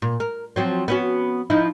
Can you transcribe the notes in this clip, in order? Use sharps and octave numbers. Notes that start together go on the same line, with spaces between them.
A#2
A#4
F3 F#3 C4
B3 C#4 F#4
F3 D#4 E4